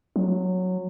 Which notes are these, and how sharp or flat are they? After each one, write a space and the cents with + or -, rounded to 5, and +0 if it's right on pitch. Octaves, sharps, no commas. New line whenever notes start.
F#3 -10